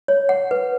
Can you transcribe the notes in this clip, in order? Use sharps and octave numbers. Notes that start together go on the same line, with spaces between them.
C#5
F#5
B4